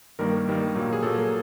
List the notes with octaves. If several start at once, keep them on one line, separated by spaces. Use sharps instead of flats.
G2 D#3 G3 A#3 A#4
G2 D#3 G3 A#3
A#2 F#3 A#3
G#4
A#2 F#3 A#3 A4